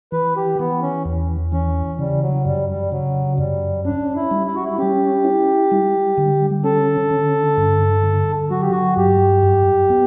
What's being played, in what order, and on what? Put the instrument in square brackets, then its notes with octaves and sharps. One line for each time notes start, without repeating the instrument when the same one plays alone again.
[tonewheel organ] E3 [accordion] B4
[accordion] G4
[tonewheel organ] E3 [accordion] B3
[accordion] C#4
[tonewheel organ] E2
[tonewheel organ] E3 [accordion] C#4
[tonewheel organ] C#3 [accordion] G3
[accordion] F#3
[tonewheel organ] F#2 [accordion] G3
[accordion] G3
[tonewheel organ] C#3 [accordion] F#3
[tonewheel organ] F#2 [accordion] G3
[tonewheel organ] C#4 [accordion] D4
[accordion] E4
[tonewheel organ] G3
[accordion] E4
F#4
E4
[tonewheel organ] C#4 [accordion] G4
[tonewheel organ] E4
G3
D3
[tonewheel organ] C#4 [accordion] A4
[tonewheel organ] D3
G2
D3
[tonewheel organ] F#3 [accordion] F#4
[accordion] G4
F#4
[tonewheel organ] G2 [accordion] G4
[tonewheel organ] F#2
B3